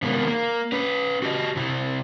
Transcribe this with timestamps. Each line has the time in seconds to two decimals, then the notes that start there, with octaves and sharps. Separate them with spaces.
0.02 C3 D#3 G#3 A#3 B3
0.28 A#3
0.72 C#4 B4
1.22 F#4 G4 D#5
1.56 C3 E4